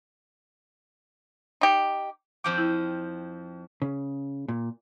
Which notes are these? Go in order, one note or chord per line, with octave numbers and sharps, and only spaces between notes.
D#4 G4
F2 F3 G5 D6
E4
C#3
A#2